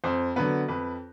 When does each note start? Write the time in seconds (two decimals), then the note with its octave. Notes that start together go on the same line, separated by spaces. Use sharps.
0.04 F2 C5
0.36 D3 F#3 B3 B4
0.68 F2 B4